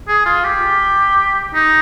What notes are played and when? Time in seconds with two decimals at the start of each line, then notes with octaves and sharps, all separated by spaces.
0.08 G#4
0.26 F4
0.44 G4
1.54 D#4